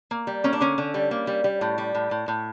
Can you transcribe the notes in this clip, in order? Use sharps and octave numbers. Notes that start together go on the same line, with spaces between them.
A#3
G3
A#3 C#4
D4
D3 C#4
D3
G3
A#3
G3
G3
A2
G3
A2
A2
A2